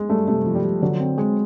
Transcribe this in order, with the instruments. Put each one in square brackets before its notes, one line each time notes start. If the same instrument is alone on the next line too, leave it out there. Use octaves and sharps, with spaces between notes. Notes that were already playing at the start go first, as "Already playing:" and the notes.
Already playing: [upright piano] G#3
[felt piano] G2 [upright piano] A3
[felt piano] C3 [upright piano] A3
[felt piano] F3
[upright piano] G3
[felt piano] F3
[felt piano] D3 [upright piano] F#3
[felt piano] C4
G#3